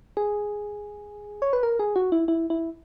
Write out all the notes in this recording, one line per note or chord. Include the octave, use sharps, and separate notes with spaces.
G#4
C#5
B4
A#4
G#4
F#4
E4
E4
E4